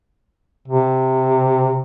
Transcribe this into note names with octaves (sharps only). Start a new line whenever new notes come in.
C3